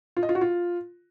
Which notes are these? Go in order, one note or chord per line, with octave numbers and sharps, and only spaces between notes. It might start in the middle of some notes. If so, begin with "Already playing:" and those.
F4
D#5
F4
F#4
F4